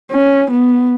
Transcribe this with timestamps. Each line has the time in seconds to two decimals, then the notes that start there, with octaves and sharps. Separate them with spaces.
0.11 C#4
0.51 B3